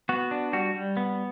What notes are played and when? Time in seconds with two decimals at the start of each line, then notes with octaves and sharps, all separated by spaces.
0.09 B3 F#4
0.31 D4
0.53 G3 F#4
0.74 G3
0.97 B3